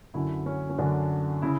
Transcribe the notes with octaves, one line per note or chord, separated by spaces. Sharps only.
F#2 D3 F#3 E4
C#4
C#4
F#2 D3 F#3 D4
C#3 E4